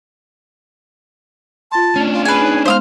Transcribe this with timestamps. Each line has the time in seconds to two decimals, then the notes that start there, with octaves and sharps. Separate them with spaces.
1.72 F4 A5 C6
1.96 A3 C#4 D4
2.13 F4
2.25 G#4 B4 G#5
2.39 D#4
2.66 G#3 B3 C5 F5 D#6 F6